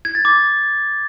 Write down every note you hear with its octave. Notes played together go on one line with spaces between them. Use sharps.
G#6
A6
D6